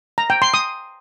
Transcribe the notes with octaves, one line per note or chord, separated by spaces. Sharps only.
A#5
G5
C6
D#6